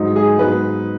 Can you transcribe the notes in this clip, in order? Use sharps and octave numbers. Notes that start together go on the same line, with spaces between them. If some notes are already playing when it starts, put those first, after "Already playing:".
Already playing: G#2 F#3 D#4
G#4
G#2 F#3 B3 D#4 B4